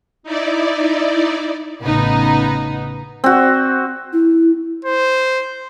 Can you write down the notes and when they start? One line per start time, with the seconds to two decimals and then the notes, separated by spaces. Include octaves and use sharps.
0.23 D#4 E4 D5
1.81 A1 C#3 B3 D#4
3.24 C4 F#4
4.13 E4
4.85 C5